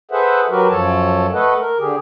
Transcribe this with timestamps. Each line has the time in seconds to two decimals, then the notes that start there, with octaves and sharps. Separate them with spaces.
0.11 G#4 A4 B4 C5 E5 F#5
0.50 F#3 F#4 G4 A#4 B4
0.70 F#2 F3 A4 C#5 A5
1.34 A3 A4 B4 D#5 F#5
1.60 A#4
1.79 D3 G4 G#4